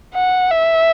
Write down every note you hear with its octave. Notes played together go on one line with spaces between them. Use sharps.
F#5
E5